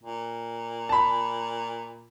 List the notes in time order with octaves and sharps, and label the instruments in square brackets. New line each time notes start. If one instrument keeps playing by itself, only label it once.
[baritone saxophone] A#2
[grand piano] A5 B5